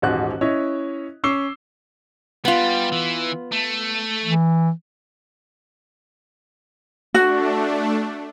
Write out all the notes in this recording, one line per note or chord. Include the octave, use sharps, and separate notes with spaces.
D#1 A1 G#2 F#4 F#6
C#4 E4 C#5 D#5
C#4 C#6 D6 E6 C7 G7
G3 B3 F4
E3
A3
E3
A3 D4 F#4